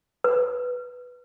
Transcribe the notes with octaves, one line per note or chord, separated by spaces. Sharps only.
B4